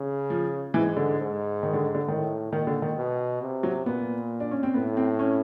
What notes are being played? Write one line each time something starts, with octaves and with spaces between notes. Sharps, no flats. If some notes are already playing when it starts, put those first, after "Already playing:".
Already playing: C#3
F3
G#2 E3
D3
G#2
D#3
D3
D3
A2 D#3
A#2 D#3
D3
D#3
B2
C3
F#3
A#2 B3
D4
C#4
C4
A2 B3
C4
C#4